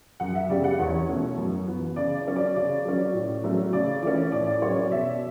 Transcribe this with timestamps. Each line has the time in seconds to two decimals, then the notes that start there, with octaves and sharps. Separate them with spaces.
0.20 F#2 F#5
0.35 E5
0.49 C#3 G3 B3 D5
0.64 F#5
0.79 E2 C#5
1.09 B2 A3 C#4
1.37 F#2
1.67 E3 B3
1.96 C#3 D5
2.16 D5
2.27 F#3 C#4
2.36 D5
2.56 C#3 D5
2.85 F#3 C#4
3.14 A2
3.44 F#3 A3 C#4
3.73 C#3 D5
4.02 E3 A3 C#4 D5
4.32 A2 D5
4.47 D5
4.62 F#3 C#4 C#5
4.76 D5
4.91 B2 E5